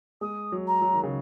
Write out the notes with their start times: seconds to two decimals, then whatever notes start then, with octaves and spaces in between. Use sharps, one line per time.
0.21 G#3 D#6
0.52 F#3
0.67 A#5
0.82 F#3
0.94 D#3
1.03 C#3